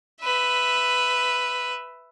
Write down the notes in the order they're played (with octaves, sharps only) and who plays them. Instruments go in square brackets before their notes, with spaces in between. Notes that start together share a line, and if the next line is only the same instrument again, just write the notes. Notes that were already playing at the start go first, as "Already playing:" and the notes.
[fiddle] B4 E5